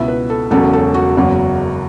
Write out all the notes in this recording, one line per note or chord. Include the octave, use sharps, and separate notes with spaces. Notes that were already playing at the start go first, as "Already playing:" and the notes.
Already playing: C#2 B2 B3 E4 E5
B4
A4
E1 E2 C#3 F#3 C#4 A4
A4
F#4
F#1 E2 C#3 F#3